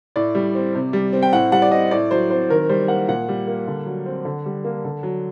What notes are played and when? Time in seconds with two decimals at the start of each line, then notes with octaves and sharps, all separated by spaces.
0.16 A2 D5
0.35 G3
0.55 C4
0.75 C3
0.93 G3
1.13 C4
1.23 G5
1.33 A2 F#5
1.52 G3 F#5
1.62 D5
1.71 C4 D#5
1.91 A2 D5
2.11 F#3 C5
2.30 C4 C5
2.50 D#3 A#4
2.69 G3 C5
2.88 A#3 F#5
3.08 A#2 F#5
3.28 G3
3.47 A#3
3.67 D3
3.86 F#3
4.06 C4
4.25 D3
4.46 G3
4.64 A#3
4.85 D3
5.03 F#3